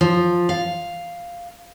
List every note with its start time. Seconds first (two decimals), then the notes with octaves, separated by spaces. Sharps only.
0.01 F3
0.49 F5